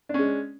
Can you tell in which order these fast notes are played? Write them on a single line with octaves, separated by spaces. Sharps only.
D4 C#4 G#3